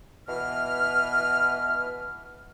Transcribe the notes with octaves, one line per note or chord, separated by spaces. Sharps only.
B2 E3 B4 F6